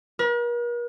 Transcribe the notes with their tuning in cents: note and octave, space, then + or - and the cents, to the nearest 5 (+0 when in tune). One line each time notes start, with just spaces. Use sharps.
A#4 +45